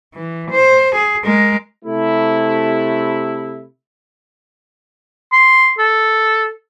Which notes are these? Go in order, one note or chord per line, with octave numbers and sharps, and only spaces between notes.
E3
C5
G#4
G#3 A#4
C3 A3 E4
C6
A4